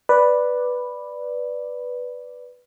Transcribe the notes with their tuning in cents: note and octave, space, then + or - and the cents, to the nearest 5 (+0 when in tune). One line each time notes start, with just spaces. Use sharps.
B4 +0 D5 +0